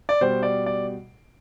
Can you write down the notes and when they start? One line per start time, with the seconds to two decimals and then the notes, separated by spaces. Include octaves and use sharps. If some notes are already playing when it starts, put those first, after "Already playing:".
0.09 D5
0.21 B2 G3 C5
0.43 D5
0.66 D5